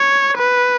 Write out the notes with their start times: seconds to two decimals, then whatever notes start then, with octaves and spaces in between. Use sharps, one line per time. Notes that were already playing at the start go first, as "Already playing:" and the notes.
Already playing: C#5
0.38 B4